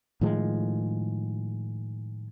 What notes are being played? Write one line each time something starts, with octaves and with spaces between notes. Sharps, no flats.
A2 D#3 F3 G#3